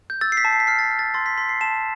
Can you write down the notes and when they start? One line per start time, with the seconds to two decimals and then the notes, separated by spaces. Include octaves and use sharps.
0.10 G6
0.21 E6 A6
0.32 C7
0.37 B6
0.45 A5
0.53 C7
0.60 B6
0.67 F6 C7
0.79 A6
0.84 B6
0.91 F6
0.99 A6
1.14 C6 A6
1.26 B6
1.37 C6 B6
1.49 C7
1.61 A5 E7